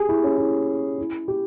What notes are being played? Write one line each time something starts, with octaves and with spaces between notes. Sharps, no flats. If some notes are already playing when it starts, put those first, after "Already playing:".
Already playing: G4 G#4
E4
C#4
E4
E4
G4